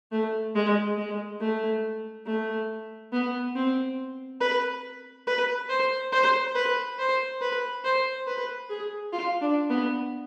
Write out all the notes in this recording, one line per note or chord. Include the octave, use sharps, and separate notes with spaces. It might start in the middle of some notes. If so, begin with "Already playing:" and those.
A3
G#3
G#3
A3
A3
B3
C4
B4
B4
C5
C5
B4
C5
B4
C5
B4
G#4
F4
D4
B3